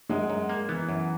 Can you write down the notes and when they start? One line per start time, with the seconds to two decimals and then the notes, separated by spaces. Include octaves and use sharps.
0.09 F#2 G#3
0.30 F#2
0.49 A#3
0.69 E3 B3
0.89 F#2